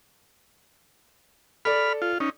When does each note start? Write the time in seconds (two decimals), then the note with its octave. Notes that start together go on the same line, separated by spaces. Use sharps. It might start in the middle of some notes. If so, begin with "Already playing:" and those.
1.65 A4 D5 B5 F6
2.02 F4
2.20 C#4 D#4